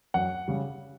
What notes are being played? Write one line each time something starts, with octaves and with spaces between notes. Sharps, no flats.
F#2 F#5
C#3 G3